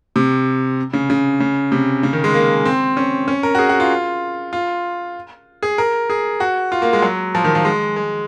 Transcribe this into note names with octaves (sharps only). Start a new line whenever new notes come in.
C3
C#3
C#3
C#3
C3
C#3
D#3
G#3
A#3
C4
C#4
C#4
A#4
F#4
G#4
F#4
F4
F4
G#4
A#4
G#4
F#4
F4
A#3
G#3
F#3
F3
D#3
F3
G#3
G#3